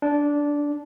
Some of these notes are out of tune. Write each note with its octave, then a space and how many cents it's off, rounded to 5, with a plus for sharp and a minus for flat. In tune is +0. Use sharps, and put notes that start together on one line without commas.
D4 -10